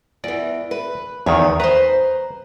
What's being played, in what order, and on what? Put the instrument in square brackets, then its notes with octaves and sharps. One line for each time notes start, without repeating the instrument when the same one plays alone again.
[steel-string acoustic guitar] E2 E3 [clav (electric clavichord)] D5
[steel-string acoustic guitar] B4
[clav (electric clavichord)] E2 D#3 [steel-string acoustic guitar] C#5
[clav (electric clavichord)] B4 [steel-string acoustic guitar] C5 A#5